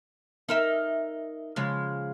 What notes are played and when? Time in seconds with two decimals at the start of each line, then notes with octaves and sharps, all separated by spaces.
0.49 D#4 A#4 E5
1.56 C#3 F3 G#3